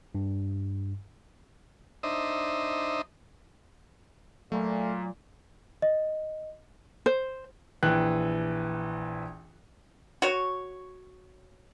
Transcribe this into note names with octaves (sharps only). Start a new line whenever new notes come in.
G2
D4 D#4 C5 D#5 E5
A#2 F#3 A3
D#5
C5
A#1 E3 G5 F#6
F#4 C#5